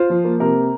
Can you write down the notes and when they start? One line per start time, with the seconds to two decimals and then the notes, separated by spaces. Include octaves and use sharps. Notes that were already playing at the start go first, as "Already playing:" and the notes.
Already playing: F4 C5
0.10 F3
0.25 A#3
0.40 C3 A#4